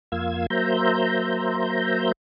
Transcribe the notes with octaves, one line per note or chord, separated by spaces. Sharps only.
F2 A#3 F4 F5 E6 G#6
F#3 A#3 C5 E5 A#5 G6